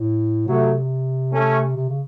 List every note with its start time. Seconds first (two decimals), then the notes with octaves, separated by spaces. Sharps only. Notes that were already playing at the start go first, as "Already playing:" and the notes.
Already playing: A2
0.46 C3 F#3 A3
1.33 A3 C#4
1.76 C3
1.89 C#3